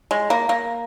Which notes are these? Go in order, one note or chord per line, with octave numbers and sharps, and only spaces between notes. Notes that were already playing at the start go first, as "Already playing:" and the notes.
G#3
A#3
A#3